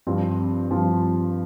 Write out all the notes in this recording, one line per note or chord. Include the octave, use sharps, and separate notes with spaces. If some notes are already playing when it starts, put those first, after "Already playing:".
G2 F3 C4 F4
G2 F3 C4 F4